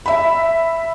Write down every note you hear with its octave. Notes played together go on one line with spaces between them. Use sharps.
E5 B5